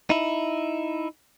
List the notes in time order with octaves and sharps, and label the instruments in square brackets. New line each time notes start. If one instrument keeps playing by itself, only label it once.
[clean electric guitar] D#4 E4